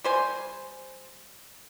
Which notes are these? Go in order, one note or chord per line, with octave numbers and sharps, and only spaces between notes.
G3 C5 G#5